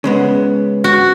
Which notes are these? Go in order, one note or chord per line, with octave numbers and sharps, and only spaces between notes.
C#3 G#3 B3
F#4